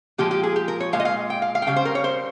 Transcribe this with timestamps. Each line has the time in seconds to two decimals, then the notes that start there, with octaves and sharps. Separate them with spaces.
0.18 A#2 F3 G#3 G4
0.31 G4
0.43 G#4
0.56 G4
0.68 A#4
0.80 C#5
0.93 A#2 G#3 F5
1.00 D#5
1.05 F5
1.30 G5
1.42 F5
1.55 F5
1.62 G5
1.67 C#3 G3 F5
1.76 C5
1.85 A#4
1.95 C#5
2.04 C5